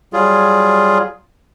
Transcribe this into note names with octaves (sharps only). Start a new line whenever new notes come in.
F#3 G3 F4 G#4